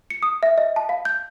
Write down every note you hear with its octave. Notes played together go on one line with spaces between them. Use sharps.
C#7
D#6
E5
D#5
A5
F5
G6